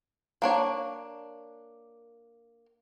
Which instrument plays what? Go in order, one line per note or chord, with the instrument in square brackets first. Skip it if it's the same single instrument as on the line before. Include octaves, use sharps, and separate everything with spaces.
[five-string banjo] A#3 D4 C#5